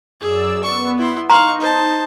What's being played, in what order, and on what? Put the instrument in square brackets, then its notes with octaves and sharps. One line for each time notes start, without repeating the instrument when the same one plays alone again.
[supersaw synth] F#2 D5 E6 [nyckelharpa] G#4
[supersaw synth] B3 [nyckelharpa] C#6
[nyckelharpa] E4 C6
[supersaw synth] D#4 [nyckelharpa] F5 C#6 [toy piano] A#5 C6
[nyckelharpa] C5 A5